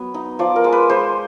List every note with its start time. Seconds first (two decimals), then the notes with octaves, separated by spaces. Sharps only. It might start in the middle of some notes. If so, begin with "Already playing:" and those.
Already playing: F#3 B3
0.14 D#4
0.39 F3 D5
0.56 A#4
0.64 G#3
0.72 B4
0.89 G#3 C5